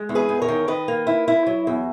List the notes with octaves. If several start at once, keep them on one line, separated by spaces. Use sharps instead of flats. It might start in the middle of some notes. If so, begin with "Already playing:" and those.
Already playing: G#3
E2
G#4 B4
E2
A#4 C#5
D#3
D#3 B4 D#5
A#3
E4
E4
F#3
E2